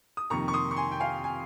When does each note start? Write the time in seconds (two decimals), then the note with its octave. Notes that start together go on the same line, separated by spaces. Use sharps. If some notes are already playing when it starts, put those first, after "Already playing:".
0.17 D#6
0.30 F2 C3 D#3 A#3 A#5 C#6
0.48 C#6
0.53 C6 D#6
0.71 C#6
0.76 G#5 C6
0.92 G5
1.00 F5 G#5
1.24 G#5